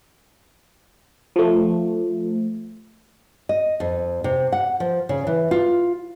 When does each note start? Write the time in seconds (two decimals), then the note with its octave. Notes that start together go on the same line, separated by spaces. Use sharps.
1.36 F3 A3
3.49 D#5
3.80 F2
4.24 C3
4.52 F#5
4.80 F3
5.09 C#3
5.27 E3
5.51 F4